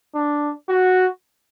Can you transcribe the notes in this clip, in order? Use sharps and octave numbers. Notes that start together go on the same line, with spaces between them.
D4
F#4